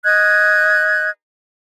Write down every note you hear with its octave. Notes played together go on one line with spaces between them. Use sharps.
D#5 F#6 G#6